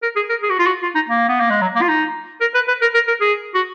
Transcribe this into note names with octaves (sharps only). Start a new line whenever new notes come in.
A#4
G#4
A#4
G#4
F#4
F4
F#4
F4
D#4
A#3
B3
A#3
G#3
F#3
A#3
F4
D#4
A#4
B4
B4
A#4
A#4
A#4
G#4
F#4